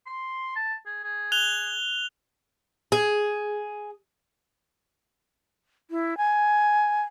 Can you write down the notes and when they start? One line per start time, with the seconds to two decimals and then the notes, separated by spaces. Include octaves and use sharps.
0.06 C6
0.56 A5
0.86 G#4
1.04 G#4
1.32 F#6 F7 G7
2.92 G#4
5.91 E4
6.17 G#5